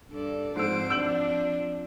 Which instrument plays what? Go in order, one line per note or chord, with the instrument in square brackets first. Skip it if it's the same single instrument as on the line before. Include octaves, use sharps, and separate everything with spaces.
[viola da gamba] G2 A4 D5
[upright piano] G#2 E6 [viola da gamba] F3 C4 [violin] C5 D7
[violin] D4 [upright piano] E6 G6 F#7